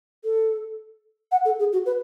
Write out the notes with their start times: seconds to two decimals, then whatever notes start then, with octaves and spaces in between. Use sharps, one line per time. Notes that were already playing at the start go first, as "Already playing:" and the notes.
0.24 A4
1.32 F#5
1.45 A4
1.59 G#4
1.73 F#4
1.86 B4